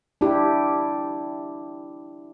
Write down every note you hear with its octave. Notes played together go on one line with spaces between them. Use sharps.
D4 E4 G4